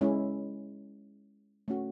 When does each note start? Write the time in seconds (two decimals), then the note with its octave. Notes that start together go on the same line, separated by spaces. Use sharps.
0.01 G#3 C#4 E4
1.68 A3 C#4 F#4